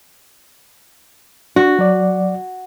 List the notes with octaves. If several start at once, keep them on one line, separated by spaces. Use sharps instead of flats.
D4 F#4
F#3 D5